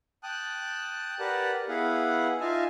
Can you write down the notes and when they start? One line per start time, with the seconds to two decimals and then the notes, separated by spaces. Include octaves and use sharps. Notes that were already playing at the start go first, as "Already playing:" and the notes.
0.23 G5 A5 D#6 F#6
1.20 G4 A#4 B4 D5 F#5 A5
1.69 B3 E4 G#4 F5 F#5
2.40 D#4 F4 E5 F5 G#5 A5